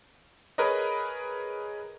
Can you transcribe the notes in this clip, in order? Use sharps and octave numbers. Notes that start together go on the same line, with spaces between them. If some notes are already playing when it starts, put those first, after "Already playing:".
G#4 A#4 B4 C#5 D#5